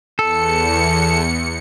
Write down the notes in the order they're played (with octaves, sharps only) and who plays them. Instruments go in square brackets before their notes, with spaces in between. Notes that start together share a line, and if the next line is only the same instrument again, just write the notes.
[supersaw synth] E2 C#7 [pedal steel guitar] A4